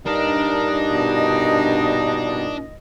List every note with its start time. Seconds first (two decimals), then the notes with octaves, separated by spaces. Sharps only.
0.06 G2 A#2 D4 D#4 A#4 D#5
0.91 B2